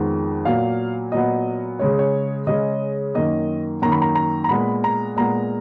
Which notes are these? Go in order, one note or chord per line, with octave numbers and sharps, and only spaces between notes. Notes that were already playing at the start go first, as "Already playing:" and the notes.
Already playing: F2 D#3 G#3 B3
A#2 F#3 B3 F5
A#2 F#3 B3 D#5
C#3 G#3 C#4 C#5
C#5
C#3 G#3 C#4 D#5
F#2 D#3 A#3 D#5
F#2 D#3 A#3 A#5
B5
A#5
A#5
A#5
A#2 G#3 B3 B5
A#5
A#2 G#3 B3 A#5